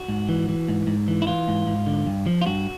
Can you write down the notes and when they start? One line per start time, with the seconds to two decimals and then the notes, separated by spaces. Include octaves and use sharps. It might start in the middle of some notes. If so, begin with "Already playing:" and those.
Already playing: F#4
0.08 G#2
0.29 E3
0.49 E3
0.68 G#2
0.87 G#2
1.08 E3
1.22 E4
1.27 E3 F4
1.48 G#2
1.67 G#2
1.86 D3
2.06 G2
2.26 F3
2.41 F4
2.46 G2 F#4